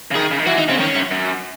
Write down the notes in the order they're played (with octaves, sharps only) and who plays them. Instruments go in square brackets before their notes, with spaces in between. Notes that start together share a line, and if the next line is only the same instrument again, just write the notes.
[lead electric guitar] C#3
[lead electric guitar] D#3 [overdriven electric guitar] G#4
[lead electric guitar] C#3
D#3
[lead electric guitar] E3 [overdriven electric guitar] F#4
[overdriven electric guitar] D#4
[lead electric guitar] C#3 [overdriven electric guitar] C4
[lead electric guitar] D#3 [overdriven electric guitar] C#4
[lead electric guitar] F#2
F#2